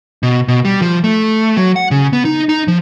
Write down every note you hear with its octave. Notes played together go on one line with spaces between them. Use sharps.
B2
B2
G3
F3
A3
F#3
F#5
C#3
B3
D#4
D#4
F3